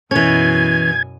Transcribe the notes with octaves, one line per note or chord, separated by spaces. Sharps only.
F#2 B2 E3 C#4 G#5 G#6